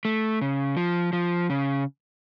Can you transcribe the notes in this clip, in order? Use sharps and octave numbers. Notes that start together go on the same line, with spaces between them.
A3
C#3
F3
F3
C#3